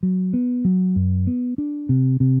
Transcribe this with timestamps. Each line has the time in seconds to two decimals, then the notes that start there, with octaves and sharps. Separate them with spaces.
0.03 F#3
0.33 B3
0.65 F#3
0.96 F#2
1.27 B3
1.58 D4
1.89 C3
2.20 C3